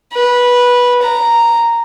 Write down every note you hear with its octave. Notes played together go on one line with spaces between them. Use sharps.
B4
A#5